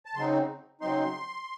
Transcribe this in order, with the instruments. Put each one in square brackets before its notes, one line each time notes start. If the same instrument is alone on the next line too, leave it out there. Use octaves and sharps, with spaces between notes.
[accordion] A5
C#3 F#3 C4 D#4 C6
C#3 F#3 C4 D#4 C6